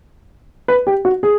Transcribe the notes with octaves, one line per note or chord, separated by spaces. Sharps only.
B4
G4
F#4
G#4